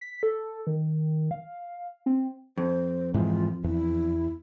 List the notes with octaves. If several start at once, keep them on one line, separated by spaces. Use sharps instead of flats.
B6
A4
D#3
F5
C4
F2 C5
G#2 E3 G#3 F4
E2 E4